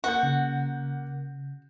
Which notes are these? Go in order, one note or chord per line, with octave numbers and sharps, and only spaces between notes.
A#3 F#4 F#5 G6
C#3